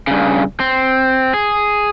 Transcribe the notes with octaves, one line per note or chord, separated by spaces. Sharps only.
G2 C#3
C4
G#4